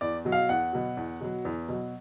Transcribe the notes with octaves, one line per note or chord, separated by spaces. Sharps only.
E2 D5
B2 F#3
F5
E2 F#5
B2 F#3
E2
B2 F#3
E2
B2 F#3